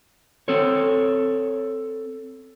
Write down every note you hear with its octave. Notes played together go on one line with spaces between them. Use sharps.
C4 A4 C#5